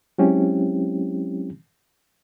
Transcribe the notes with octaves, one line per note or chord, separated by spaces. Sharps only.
F#3 G#3 C4 C#4 E4 G4